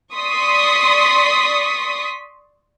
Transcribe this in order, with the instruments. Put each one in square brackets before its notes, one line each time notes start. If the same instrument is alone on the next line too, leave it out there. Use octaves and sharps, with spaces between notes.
[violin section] D5 C6 C#6 D#6 B6